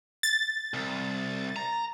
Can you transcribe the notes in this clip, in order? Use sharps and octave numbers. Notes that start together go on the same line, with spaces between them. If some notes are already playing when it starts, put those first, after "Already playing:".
A6
C2
A#5